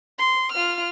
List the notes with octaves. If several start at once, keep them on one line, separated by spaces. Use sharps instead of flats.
C6
F4 F6